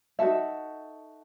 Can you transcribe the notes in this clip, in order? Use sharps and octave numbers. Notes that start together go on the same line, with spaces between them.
D#4 F#4 A4 E5